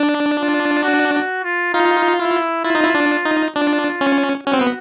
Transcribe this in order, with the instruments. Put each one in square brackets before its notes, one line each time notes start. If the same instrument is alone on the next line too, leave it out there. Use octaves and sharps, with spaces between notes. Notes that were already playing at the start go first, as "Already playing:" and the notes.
Already playing: [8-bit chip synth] D4
[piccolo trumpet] F4
F#4
F#4
F4
[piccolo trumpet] D#4 [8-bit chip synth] F4
[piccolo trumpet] E4
[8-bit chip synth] E4 [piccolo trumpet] F4
[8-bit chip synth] D#4
E4
D4
D#4
[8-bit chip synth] D4 [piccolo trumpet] F4
[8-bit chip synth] C#4
[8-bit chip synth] C#4 [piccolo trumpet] F#4
[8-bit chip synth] C4
B3